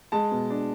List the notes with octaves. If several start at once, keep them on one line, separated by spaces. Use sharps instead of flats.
G#3 A5
B2
D4